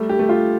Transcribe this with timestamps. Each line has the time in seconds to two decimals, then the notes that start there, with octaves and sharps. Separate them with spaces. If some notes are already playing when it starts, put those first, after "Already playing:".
Already playing: G3 A3
0.09 G4
0.19 A3
0.29 F4